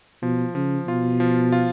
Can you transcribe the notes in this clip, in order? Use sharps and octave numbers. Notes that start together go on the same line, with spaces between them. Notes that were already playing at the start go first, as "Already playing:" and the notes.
B2 F3
C#3 F3
B2 F4
F3
F4